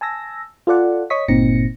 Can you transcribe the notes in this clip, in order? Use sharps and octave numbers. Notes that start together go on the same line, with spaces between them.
G#5 A5 E6 A#6
F4 A4 D5 F#5
C#5 D#5 C#6 D#6 B6
G1 A#2 C4 D#4 A#6 C#7